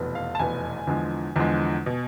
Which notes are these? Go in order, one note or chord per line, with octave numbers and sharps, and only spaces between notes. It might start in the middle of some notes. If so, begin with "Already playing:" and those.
Already playing: F1 E2 B2 B3
F5
A5
F1 E2 B2 B3 G#5
E2 D3 F3 G#3
E2 D3 F3 G#3
B2